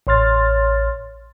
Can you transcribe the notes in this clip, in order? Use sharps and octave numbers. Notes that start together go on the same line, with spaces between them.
A1 C#5 C6 F6 A6